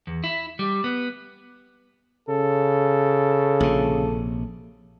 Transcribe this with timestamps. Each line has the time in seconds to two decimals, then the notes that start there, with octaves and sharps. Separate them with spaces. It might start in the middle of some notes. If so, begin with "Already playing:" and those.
0.07 E2
0.24 E4
0.59 G3
0.84 B3
2.29 C#3 A4
3.60 A#1 C3